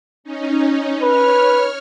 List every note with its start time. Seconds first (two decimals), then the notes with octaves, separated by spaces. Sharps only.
0.24 C#4 D#4
1.02 B4 C#5 F6